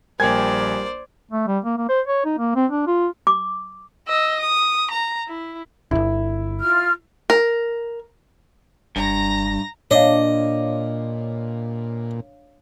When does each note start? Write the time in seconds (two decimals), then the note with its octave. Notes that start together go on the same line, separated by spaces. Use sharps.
0.20 A#1 G3 A#3 C5 D5 G5 G#5 G#6
1.31 A3
1.48 G3
1.65 A#3
1.78 A#3
1.89 C5
2.08 C#5
2.25 D#4
2.39 A#3
2.56 C4
2.71 D4
2.87 F4
3.27 D6
4.08 D#5 E6
4.40 D#6
4.91 A#5
5.28 E4
5.91 D1 G1 E4
6.60 F4 F6
7.30 A#4
8.96 F#1 G2 A#5 A#6
9.91 A#2 D4 C#5 D#5 F5